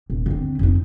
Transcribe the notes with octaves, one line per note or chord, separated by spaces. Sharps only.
D#1
D3 C4
F2 D#4